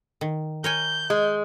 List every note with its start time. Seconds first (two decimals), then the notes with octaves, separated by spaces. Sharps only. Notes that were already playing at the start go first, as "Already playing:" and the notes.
0.21 D#3
0.64 A#4 C#5 G#5 G6
1.10 G#3